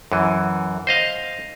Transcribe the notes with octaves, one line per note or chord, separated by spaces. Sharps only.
F#2 E3
C5 D#5 F5